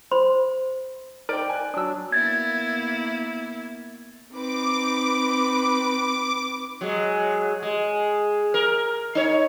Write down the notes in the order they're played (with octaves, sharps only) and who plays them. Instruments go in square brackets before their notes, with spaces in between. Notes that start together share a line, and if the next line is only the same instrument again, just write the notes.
[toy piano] C5 B5 C6
[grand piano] D#4 D6 D7 [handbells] A#4 C5 [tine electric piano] D5 G5
[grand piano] G#5 F#6
[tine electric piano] F#3 D4 [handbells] D#6 E6
[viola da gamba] A#3 B3 E4 [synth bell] G#6 A6
[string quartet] C4 D#4 B4 [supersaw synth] D6
[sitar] F#3 G#3
G#3
A#4
D#4 C#5